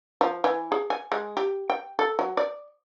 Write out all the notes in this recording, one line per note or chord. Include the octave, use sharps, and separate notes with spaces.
F3
E3
G#4
G#5
G#3
G4
G5
A4
F#3
D5